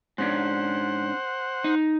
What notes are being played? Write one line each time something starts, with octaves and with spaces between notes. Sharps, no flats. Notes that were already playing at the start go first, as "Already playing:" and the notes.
G#2 C#4 D4 C5 F#5
D#4